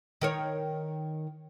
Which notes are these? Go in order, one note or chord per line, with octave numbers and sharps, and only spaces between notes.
D#3 A#4 C#5